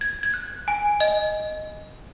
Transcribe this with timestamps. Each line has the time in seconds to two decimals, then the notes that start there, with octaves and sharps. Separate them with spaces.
0.01 G#6
0.23 G#6
0.34 F#6
0.68 G#5
1.00 D#5